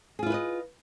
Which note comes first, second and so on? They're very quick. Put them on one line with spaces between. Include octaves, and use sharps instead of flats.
G#4 F4 E4 B4 D#5